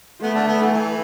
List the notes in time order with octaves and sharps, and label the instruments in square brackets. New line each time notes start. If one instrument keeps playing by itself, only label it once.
[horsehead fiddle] A3 [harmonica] B3
[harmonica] D3 D4
B3
E3
E3